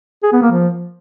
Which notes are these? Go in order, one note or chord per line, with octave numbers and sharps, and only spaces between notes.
G#4
B3
A#3
F3